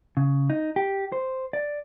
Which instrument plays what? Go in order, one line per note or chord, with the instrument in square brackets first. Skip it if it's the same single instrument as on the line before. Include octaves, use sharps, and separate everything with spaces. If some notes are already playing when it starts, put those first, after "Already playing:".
[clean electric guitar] C#3
D#4
G4
C5
D5